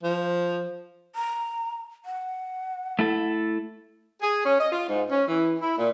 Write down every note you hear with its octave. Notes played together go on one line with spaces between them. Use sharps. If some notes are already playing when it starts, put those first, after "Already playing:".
F3
A#5
F#5
A3 E4 A4
G#4
C#4
D#5
F4
G#2
C#4
E3
E4
A#2